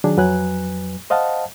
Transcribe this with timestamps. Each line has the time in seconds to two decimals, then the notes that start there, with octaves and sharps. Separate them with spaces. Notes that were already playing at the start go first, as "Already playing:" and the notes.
0.04 D#3 F#3 D4 G#4
0.17 F2 F#3 B4 G#5 F#6
1.10 C5 D#5 F5 F#5 A5